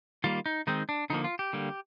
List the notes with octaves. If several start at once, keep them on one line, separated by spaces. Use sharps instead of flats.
D#3 G3 A#3 F4
D#4
D#3 G#3 C4 D#4
D4
D3 F3 A#3 D#4
F4
G4
D3 G3 A#3